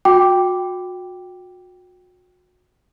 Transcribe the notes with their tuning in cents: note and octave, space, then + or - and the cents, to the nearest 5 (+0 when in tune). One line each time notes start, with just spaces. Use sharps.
F#4 -35 G5 +0 D6 +0